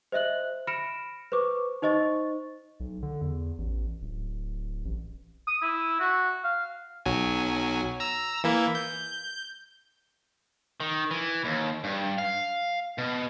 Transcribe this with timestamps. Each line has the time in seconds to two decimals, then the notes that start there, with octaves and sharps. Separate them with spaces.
0.12 C5 D#5 E5 F#6 F#7
0.67 B5 F6 A#6 C#7 D7 E7
1.32 B4 C5 C#6 D6
1.82 D#4 C5 D#5 C#6 A6
2.80 B1
3.03 D3
3.21 E2
3.58 A1
4.02 D1
4.85 A1
5.47 D#6
5.62 E4
6.00 F#4
6.44 F5
7.06 B1 F#3 G#5
8.00 A#5 E6
8.44 E3 A#3 E4
8.75 G6
10.80 D#3
11.11 E3
11.45 D#2
11.84 G2
12.18 F5
12.98 B2